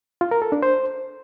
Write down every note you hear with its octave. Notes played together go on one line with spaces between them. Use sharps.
F4
A#4
A4
D4
C5